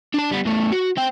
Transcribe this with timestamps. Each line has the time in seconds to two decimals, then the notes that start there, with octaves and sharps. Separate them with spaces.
0.14 D4 A5
0.31 G3 B3
0.45 E2 A3
0.72 F#4
0.97 C4 G5